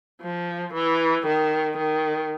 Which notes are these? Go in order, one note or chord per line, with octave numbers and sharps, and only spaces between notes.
F3
E3
D#3
D#3